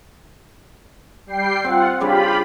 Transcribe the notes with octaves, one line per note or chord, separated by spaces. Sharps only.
G3 G5 C7
C4 F4 F#5
C#3 G3 D4 F4 G4 B5